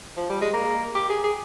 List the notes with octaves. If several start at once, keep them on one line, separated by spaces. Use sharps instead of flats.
F3
G3
G#3
A#3
G4
G#4
G#4